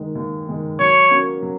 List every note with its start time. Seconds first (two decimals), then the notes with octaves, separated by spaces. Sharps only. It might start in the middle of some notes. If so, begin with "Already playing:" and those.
Already playing: D#2 D#3 G#3
0.15 D#2
0.47 D#3 G#3
0.79 F#3 C#5
1.11 A#3 C#4 F#4
1.43 F#3